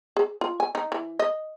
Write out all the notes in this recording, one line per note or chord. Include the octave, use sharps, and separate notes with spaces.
G#4
F4
G#5
D#4
E3
D#5